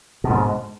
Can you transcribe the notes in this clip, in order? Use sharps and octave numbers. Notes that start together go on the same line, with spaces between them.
G#2 B2 D3